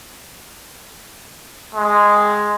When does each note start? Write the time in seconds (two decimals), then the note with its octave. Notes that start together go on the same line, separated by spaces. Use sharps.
1.74 G#3